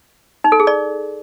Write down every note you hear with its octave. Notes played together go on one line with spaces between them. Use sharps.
D#4
A4
G#4
D5